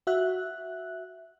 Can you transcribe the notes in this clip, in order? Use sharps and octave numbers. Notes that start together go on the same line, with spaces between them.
F#4 E5 F#6